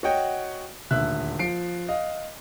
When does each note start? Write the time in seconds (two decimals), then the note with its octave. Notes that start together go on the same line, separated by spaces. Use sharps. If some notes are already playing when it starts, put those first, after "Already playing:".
0.03 F#4 C#5 D#5 F#5 G5
0.91 D#1 D2 E5 F#6
1.39 F3 C7 D7
1.88 D#5 F5